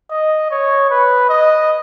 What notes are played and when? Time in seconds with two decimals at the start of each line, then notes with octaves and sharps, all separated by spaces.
0.11 D#5
0.51 C#5
0.90 B4
1.29 D#5